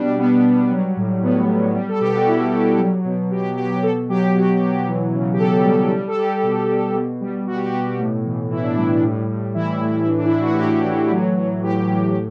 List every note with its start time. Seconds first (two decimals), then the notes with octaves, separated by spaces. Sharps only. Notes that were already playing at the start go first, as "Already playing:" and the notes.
Already playing: B2 G3 D4
0.18 G3 B3
0.45 G3
0.71 F#3
0.97 A2
1.23 A2 B3
1.48 F#3
1.75 G3
1.88 A4
2.00 B2 G4
2.14 F#4
2.26 G3 E4
2.53 G3
2.78 F#3
3.05 B2
3.30 B2 G4
3.57 F#3 G4
3.82 B2 A4
4.09 F#3 G4
4.35 B2 F#4
4.61 F#3
4.87 E3
5.13 C#3
5.33 G4
5.39 C#3 A4
5.65 G3
5.90 G3
6.07 A4
6.17 G3 G4
6.43 B2
6.68 B2
6.94 B2
7.21 G3
7.47 G3 F#4
7.56 G4
7.65 F#4
7.72 B2
7.98 A2
8.25 E3
8.50 E3 E4
8.62 D4
8.74 G3 E4
9.03 A2
9.29 A2
9.54 E3 E4
9.81 A2
10.06 E3 D4
10.18 D4
10.25 E4
10.32 E3
10.41 F#4
10.53 G4
10.59 A2 F#4
10.85 E3
11.10 F#3
11.37 F#3
11.63 A2 G4
11.88 A2
12.15 A2